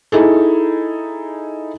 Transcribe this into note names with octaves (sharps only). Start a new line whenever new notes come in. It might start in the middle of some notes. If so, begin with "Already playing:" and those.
D#4 E4 G#4 A4